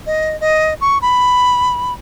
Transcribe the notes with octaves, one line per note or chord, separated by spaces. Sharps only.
D#5
D#5
C#6
B5